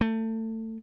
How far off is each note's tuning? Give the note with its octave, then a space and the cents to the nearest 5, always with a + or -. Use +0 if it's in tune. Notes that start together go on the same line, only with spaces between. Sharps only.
A3 +25